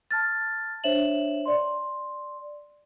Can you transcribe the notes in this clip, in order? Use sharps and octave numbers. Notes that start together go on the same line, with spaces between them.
A5 F6 A6
D4 C5 C#5 E5 E7 F#7
D5 C6